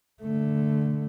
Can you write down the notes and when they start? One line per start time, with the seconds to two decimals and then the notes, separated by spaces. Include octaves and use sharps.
0.22 D3 A3